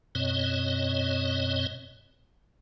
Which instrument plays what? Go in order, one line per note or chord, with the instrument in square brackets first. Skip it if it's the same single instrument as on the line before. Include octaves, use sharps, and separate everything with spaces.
[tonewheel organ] F#2 B2 C4 C#5 D#5